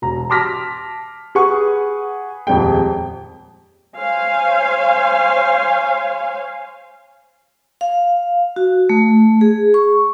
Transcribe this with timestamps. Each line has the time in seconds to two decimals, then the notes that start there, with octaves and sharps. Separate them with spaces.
0.02 E1 A#5
0.30 A5 C6 D6 F6 A#6 B6
1.35 G#4 B4 F#5 G#5 C#6
2.47 D#1 F2 G#3 G5
3.96 C5 C#5 F5 G#5
7.81 F5
8.56 F#4
8.89 A3
9.41 G#4
9.74 C#6